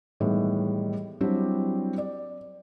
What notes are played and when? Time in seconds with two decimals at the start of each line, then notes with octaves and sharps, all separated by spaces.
0.20 A2 D#3 E3 G3 G#3 B3
1.21 F#3 G3 C4 D4 E4 G4
1.98 D5